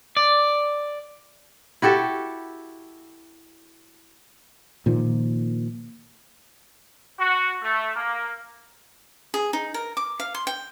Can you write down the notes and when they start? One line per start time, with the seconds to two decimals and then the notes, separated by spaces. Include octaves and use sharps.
0.17 D5
1.82 E4 F#4 G4 A4
4.86 A#2 D#3 F3
7.19 F#4
7.62 A3
7.96 A#3
9.34 G#4
9.53 D#4
9.74 A#4
9.97 D6
10.20 F5
10.34 C6
10.47 G5